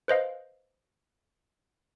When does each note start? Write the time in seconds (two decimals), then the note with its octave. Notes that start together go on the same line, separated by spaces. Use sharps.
0.08 B4 C5 D#5 F5